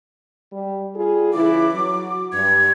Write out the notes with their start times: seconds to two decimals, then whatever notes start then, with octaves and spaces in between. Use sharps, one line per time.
0.52 G3
0.94 G3 F4 G#4
1.33 C#3 E3 E4 D6
1.75 F#3
2.33 G2 G#6